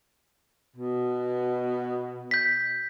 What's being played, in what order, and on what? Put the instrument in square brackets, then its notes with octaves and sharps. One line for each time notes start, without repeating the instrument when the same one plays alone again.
[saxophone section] B2
[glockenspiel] G6 B6